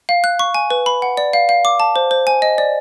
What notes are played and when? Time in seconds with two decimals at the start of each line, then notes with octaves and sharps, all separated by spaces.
0.09 F5
0.24 F#6
0.39 C#6
0.55 G#5
0.70 B4
0.86 B5
1.02 F#5
1.17 D5
1.33 F5
1.49 F5
1.65 D6
1.80 A5
1.96 C5
2.11 C5
2.27 G#5
2.42 D#5
2.58 D5